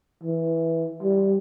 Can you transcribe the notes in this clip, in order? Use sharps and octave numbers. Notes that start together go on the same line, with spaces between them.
E3
G3